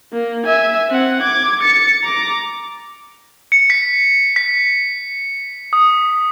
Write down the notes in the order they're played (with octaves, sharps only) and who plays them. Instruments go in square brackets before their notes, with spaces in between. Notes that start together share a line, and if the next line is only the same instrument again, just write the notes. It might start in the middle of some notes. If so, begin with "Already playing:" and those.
[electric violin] A#3
E5 G#5
C4 F#5
D6 G#6
A6 C#7
A#5 D6
[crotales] C#7
B6
B6
D#6